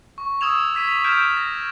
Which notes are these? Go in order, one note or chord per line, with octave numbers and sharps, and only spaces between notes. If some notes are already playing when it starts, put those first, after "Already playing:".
C#6
D#6 E6 G#6 E7 F7
D6 G#6 B6 D#7
B6 F7
F6 G6 G#6 D7 E7
A#6